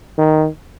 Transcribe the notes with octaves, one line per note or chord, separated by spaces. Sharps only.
D#3